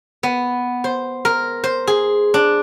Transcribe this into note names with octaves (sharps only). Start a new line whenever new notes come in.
B3
C5
A#4
C5
G#4
D4